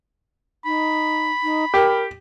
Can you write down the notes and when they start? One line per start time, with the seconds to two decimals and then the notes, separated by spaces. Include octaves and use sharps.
0.65 D#4 B5
1.43 D#4
1.74 G4 A#4